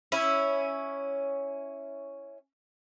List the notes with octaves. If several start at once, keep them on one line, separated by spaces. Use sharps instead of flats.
C#4 E4